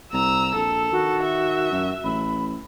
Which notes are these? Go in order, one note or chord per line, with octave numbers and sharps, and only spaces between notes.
C2 A#5 E6
A#1 A4
D#3 F#4
E5
F#2
A1 B5